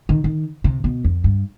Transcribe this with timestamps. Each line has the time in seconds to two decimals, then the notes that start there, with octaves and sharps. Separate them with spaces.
0.09 D#3
0.24 D#3
0.64 C3
0.84 B2
1.04 F2
1.24 G2